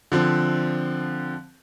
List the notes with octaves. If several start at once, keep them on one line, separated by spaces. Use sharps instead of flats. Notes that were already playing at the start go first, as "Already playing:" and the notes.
D3 F3 C4